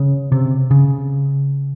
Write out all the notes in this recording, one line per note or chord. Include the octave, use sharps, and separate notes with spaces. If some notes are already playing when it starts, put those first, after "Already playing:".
Already playing: C#3
C3
C#3